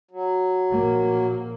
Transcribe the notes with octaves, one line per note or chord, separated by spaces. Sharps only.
F#3
A#1 A#3